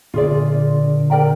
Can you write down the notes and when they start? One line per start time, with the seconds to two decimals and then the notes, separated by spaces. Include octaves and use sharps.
0.14 A#2 D3 F4 G#4 D5
1.10 A#4 D5 G5 A#5